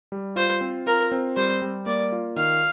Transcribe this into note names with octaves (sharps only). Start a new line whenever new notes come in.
G3
F4 C5
C4
F4 A#4
C4
G3 C5
G3
A#3 D5
F4
D#3 F5